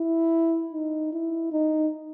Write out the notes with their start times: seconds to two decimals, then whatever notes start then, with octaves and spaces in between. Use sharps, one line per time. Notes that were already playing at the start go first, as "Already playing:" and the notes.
Already playing: E4
0.73 D#4
1.13 E4
1.52 D#4